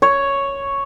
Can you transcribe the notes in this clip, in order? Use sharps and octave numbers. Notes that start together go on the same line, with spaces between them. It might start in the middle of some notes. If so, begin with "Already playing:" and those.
C#5